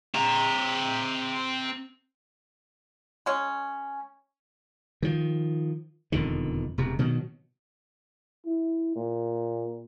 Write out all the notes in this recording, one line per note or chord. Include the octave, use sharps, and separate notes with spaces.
C4 A#5
G#3 C#4
D#3 F3
E1 F2 D3 D#3
E1 C3
B2 D#3 F#3
E4
A#2